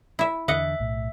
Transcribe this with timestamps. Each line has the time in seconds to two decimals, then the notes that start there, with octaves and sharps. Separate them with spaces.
0.19 E4 E5
0.48 E2 D3 D#5 E5 F#5
0.80 B1 A2